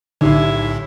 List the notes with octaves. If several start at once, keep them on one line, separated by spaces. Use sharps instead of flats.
B1 A2 D3 D#4 E4 G4 E5